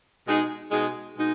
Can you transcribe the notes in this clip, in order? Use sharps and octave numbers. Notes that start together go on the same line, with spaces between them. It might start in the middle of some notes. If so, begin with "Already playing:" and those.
B2 G#3 D#4 G#4
B2 G#3 D#4 G#4
B2 G#3 D#4